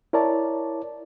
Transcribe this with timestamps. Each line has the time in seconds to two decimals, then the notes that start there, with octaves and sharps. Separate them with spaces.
0.13 E4 A#4 C#5 D5 A5